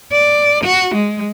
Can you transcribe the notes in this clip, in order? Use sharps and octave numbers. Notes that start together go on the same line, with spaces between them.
D5
F#4
G#3